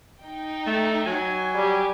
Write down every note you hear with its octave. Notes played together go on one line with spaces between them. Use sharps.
D#4 G5
A3
F#3 G#5
G3 G4